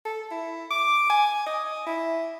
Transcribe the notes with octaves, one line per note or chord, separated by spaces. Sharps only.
A4
E4
D6
G#5
D#5
E4